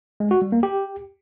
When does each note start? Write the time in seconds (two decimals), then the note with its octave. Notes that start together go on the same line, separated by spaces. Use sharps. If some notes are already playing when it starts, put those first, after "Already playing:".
0.20 G#3
0.31 F#4
0.42 G3
0.52 A#3
0.63 G4